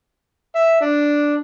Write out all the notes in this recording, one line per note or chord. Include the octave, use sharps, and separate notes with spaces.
E5
D4